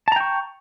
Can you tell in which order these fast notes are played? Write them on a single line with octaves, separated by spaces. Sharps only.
A5 A#5 G5 C#6